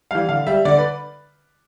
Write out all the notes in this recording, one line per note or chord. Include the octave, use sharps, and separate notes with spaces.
E3 G3 F5
D3 F5
G3 E5
D3 D5
B4